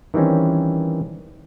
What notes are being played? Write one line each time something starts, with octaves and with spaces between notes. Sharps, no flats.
D#3 E3 G3 C4 C#4